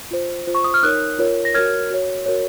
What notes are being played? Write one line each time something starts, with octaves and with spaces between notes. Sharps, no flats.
F4 C5
F4 C5
C#6
D#6
F6
D#4 A#4 C#5 D#6 F#6
F4 A#4 C#5
A#6
F#4 A#4 C#5 F6 G#6
F#4 C#5
F#4 A#4 C#5